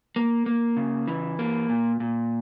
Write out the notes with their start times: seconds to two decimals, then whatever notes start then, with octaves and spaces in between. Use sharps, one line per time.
0.16 A#3
0.46 A#3
0.77 C#3
1.08 E3
1.39 A#3
1.69 A#2
2.00 A#2